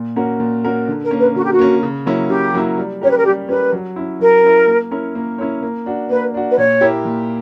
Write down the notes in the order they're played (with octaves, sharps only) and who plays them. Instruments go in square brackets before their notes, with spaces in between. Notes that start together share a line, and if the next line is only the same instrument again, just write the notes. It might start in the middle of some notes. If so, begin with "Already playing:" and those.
Already playing: [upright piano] A#2
A#3 C#4 F#4 A#4
A#2
A#3 C#4 F#4 A#4
D3
[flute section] A#4
[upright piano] A#3 C#4
[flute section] B4
[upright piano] D3 [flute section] F#4
[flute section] G4
F#4
[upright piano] A#3 C#4
C#3
F#3 A#3 C#4 E4
[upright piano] C#3 [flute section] G4
[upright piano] F#3 A#3 C#4 E4
G3
[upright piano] C#4 G4 A#4 [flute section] C#5
[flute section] B4
A#4
[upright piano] G3 [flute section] G4
[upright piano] C#4 G4 A#4 [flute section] B4
[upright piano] F#3
C#4 E4
[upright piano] F#3 [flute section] A#4
[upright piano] C#4 E4
A#3
C#4 E4 A#4 C#5
A#3
C#4 E4 A#4 C#5
A#3
D4 F#4
[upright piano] A#3 [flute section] B4
[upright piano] D4 F#4
[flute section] B4
[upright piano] A#2 [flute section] C#5
[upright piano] A#3 E4 G4
A#2